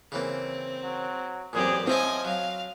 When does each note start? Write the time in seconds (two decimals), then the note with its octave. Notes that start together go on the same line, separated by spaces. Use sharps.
0.12 C#3 E3 A#3 C4
0.83 F#3
1.53 A1 F#2 A#2 C4 G4 G#4
1.87 F3 C4 C#4 D#5 E5 G#5 A5
2.25 F#3 F5